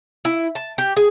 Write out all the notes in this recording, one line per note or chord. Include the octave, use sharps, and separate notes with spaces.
E4
A5
G4
G#4